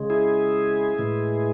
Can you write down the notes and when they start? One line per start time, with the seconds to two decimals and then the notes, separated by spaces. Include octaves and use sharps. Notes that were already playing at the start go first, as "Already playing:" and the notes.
Already playing: C#3 G#3
0.10 E4 G#4
0.98 A2 E3 G#3